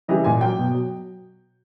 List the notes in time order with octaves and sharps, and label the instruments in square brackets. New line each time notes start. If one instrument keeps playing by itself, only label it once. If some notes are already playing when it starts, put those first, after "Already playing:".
[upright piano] C#3 E3 G3 D#5
A#2 G#5
F#3 G5
B2
F#3